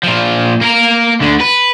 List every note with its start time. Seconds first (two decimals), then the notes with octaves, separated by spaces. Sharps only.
0.03 A#2 F3
0.61 A#3 A#4
1.21 D2 D3
1.40 B4